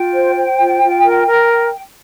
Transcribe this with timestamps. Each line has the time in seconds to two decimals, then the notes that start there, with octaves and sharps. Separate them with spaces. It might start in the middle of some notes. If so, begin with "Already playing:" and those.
Already playing: F4 G5
0.13 C5
0.36 C5
0.59 F4
0.81 F4
1.04 A#4
1.26 A#4